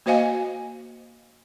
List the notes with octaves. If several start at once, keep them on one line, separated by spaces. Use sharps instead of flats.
A#3 F#4 C5 D#5 F5 G#5